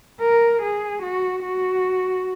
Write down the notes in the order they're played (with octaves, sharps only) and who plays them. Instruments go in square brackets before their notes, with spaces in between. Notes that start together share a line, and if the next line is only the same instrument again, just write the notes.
[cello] A#4
G#4
F#4
F#4